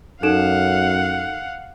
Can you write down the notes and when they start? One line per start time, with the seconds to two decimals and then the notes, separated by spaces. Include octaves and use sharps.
0.23 F#2 D#4 A4 F5 F#5 E7